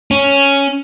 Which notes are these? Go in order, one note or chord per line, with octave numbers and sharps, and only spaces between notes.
C#4